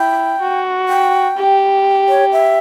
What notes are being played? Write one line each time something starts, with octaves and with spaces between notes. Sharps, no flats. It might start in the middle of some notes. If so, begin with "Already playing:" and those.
Already playing: E4 G5
F#4
G5
G4
C#5
E5